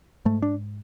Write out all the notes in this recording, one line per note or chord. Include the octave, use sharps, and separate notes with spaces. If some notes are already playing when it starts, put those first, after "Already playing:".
G#2 A3
D4